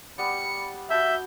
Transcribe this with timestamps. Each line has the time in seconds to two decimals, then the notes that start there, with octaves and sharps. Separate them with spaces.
0.18 G3 B3 D5 C#7
0.90 F#4 E5 A5 E6 G6